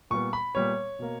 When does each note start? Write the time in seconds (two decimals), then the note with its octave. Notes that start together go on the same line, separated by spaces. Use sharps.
0.10 A#2 G3 B3 C#6
0.33 B5
0.54 A#2 G3 B3 C#5
0.99 B2 A#3